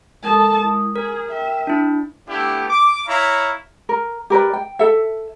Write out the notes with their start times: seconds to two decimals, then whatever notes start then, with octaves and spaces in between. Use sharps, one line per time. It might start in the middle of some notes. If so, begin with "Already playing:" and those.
0.23 G#3 A4 A#4 A5 D#6
0.65 E4
0.96 G#4 A#4
1.31 E5 G5
1.67 D4 E4
2.28 A3 B3 D4 E4 G4
2.68 D6
3.07 E4 C#5 F5 A#5 B5
3.89 A#4
4.30 G4 A#4 B4 D5
4.53 G5
4.79 A4 E5